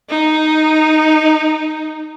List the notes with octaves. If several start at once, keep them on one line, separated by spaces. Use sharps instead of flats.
D#4